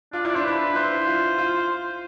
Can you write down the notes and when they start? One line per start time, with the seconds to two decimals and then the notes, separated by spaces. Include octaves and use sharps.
0.13 D4 F4
0.25 E4 D5
0.35 D4 C5
0.45 E4 B4
0.75 E4 C5
1.06 F4
1.38 F4